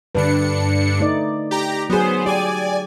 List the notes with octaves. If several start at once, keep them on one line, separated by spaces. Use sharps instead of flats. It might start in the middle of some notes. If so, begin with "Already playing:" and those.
G2 D3 D4 B4 C#7
A3 D#4 D5
G4 A#5
F#3 B3 G#4 C5
G4 D5 G#5